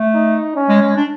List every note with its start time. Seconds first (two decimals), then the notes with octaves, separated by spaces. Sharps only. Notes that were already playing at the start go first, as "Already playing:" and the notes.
Already playing: A3
0.14 D#4
0.55 C#4
0.69 G#3
0.82 G#3
0.96 D4